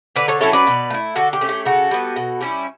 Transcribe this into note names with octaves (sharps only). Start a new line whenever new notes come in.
D3 B4 D5
A4 C#5
F#3 C#4 E4 A4 C#5
B4 D5
B2
A3 E4
D3 F#4 A4
G4
A3 C#4
G4
C#3 F#4 A4
G3 B3
B2
G3 C#4 E4